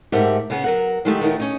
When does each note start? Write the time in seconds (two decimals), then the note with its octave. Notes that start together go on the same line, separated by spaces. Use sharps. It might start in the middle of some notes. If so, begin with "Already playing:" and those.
0.12 G#2 A3 G4 A#4 E5 F#5
0.50 C#3 B3 C#4
0.64 F#3 A#4 F#5
1.05 D#3 F#3 G#3 A3 D#4 G4
1.21 D#3 F#3 A3 B3 D#4 E4
1.40 C#4 D#4